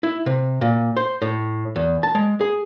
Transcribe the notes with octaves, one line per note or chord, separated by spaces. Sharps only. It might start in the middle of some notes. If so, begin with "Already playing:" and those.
E4
C3
A#2
C5
A2
E2
A5
G#3
G#4